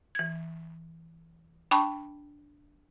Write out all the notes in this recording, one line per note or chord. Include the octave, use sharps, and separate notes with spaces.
E3 G#6
D4 G5 A5 B5 C#6